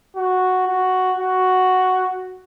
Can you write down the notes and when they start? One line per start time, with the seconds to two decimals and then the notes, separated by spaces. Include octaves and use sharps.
0.16 F#4
0.68 F#4
1.20 F#4